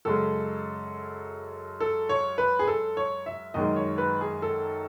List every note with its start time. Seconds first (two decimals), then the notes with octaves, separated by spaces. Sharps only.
0.05 F#2 C#3 G#3 A4
1.80 A4
2.09 C#5
2.38 B4
2.59 G#4
2.68 A4
2.97 C#5
3.26 E5
3.54 F#2 D#3 G#3 D#5
3.76 C#5
3.98 B4
4.21 G#4
4.42 A4